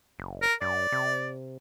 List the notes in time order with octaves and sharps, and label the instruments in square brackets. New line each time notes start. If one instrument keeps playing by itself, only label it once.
[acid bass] F#1
[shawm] A#4
[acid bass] F#2 [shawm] D5
[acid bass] C3